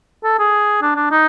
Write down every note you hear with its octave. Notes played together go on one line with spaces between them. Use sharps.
A4
G#4
D4
D4
D#4